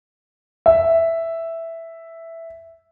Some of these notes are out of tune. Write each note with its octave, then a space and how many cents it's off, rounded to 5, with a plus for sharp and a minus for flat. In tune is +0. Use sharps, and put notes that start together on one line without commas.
E5 +0